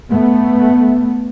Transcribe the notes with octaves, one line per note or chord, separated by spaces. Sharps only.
A3 B3